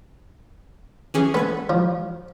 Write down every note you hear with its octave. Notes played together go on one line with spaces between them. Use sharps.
E3 C#4 G#4
B3 A4 B4 G#6
F3